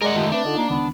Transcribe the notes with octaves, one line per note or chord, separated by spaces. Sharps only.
G#3 G#4 A#4 D5 F#5
D#3 A3 F4 G4 F#5
A3 C4 D4 B4
D3 D#4 F4 D#5
A#3
C#2 D#3 B3